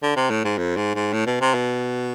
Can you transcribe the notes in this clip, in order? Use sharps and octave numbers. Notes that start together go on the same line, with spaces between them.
D3
C3
A2
G#2
F2
G#2
G#2
A2
B2
C3
B2